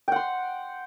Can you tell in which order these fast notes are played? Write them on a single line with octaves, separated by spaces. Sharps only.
G5 F#5 C6